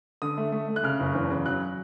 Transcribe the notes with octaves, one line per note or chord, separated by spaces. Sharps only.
D3 D#6
A3
A3
A3
F#6
C#3 F6
F#1
E2
C#3
F#3 F#6